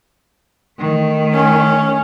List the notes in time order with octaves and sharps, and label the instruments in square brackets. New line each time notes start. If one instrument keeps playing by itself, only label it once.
[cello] D#3 A3
[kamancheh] C#4